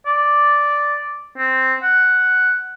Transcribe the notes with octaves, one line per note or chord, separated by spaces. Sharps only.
D5
C4
F#5